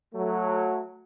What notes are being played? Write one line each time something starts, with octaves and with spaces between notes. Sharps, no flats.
F#3 A3